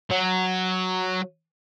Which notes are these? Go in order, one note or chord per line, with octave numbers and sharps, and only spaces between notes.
F#3